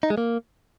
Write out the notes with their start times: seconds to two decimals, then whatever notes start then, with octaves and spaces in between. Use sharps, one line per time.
0.03 D#4
0.10 G#3
0.18 A#3